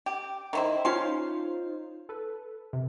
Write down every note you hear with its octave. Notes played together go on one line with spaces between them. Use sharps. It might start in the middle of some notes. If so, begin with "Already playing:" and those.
G4
D#3 E4 C5
C#4 D#4 F4 C5 F5 C6
A4 B4
C3